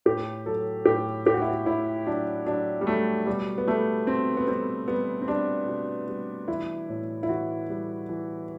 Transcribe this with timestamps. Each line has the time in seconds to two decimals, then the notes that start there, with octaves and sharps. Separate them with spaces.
0.06 A2 G4
0.46 F#3 A4
0.85 A2 G4
1.26 A2 G4
1.34 F#4
1.42 E4
1.50 F#4
1.66 A2 E4
2.06 F#3 D4
2.47 F#3 D4
2.81 G3
2.87 F#3 A3
3.27 B2 G3
3.58 B3
3.68 G3 A3
4.07 B2 C4
4.37 B3
4.47 G3 C4
4.88 G3 B3
5.22 C4
5.28 G3 D4
5.68 B2
6.08 G3
6.48 E3 E4
6.89 A2
7.23 E4
7.28 E3 F#4
7.69 G3
8.09 E3